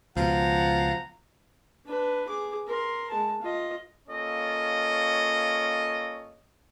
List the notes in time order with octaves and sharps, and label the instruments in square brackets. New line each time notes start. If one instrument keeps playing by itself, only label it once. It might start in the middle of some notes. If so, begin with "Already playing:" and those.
[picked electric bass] C#2 B2 [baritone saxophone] F3 [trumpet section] F#5 A#5
[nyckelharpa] D4 B4
G#4 D6
A#4 C6
G#3 A5
F4 D#5
[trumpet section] A#3 C#4 F4 A4 C#5 D#5